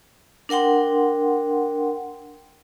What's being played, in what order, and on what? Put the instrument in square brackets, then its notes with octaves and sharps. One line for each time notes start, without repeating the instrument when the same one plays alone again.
[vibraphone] D4 A#4 F#5 G5 C6